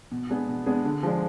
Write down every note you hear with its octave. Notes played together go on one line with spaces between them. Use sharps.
B2
G#3 B3 D4 G#4
B2
G#3 B3 D4 G#4
D3
F3 G#3 D4